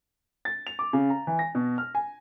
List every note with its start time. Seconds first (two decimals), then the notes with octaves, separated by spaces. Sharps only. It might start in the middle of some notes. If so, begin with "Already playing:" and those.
0.45 A6
0.67 F7
0.79 D6
0.93 C#3
1.10 A#5
1.27 E3
1.39 A#6
1.55 B2
1.78 F6
1.95 G#5